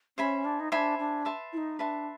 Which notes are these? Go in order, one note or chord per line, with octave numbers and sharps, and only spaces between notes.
C#4 C5 E5 G#5 B5
D4
D#4
D4 D#4 C5 E5 G#5 B5
D4
B4 E5 A5 C6
E4
D#4
D4 B4 E5 A5 C6